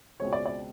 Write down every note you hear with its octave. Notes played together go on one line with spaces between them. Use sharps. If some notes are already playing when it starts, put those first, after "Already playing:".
C#2 B2 G#3 C4 C#5
D5
D5